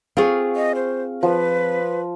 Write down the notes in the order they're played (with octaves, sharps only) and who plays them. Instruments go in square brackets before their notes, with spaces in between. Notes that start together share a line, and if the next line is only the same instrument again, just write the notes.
[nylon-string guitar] C4 F4 G#4 [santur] F5 C#6
[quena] D#5
C5
[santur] F3 [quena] B4